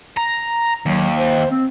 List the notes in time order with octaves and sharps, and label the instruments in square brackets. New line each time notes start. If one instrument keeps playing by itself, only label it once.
[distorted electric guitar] A#5
[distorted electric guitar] D#2 [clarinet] F#3
[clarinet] C5
C4